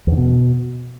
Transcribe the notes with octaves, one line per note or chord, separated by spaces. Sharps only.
E2
D3
B2